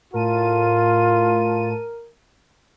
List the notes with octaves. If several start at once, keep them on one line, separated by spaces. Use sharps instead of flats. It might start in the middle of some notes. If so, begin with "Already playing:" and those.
A2 F4 A#4 A5 D#7